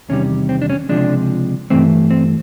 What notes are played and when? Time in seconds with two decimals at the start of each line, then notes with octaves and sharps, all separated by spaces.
0.09 E2 C3 D#3 G3 C#4
0.49 C4
0.62 D4
0.70 C#4
0.89 C#2 C3 F3 G#3 D4
1.70 G2 E3 A3 C4
2.10 C4